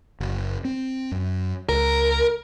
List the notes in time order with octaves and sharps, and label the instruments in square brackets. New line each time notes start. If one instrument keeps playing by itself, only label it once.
[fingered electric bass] F#1
C4
F#2
[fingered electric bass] C#2 [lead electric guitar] A#4